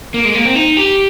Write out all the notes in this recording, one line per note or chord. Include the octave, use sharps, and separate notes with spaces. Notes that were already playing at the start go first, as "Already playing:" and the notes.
A#3
G#3
A#3
C4
D#4
G4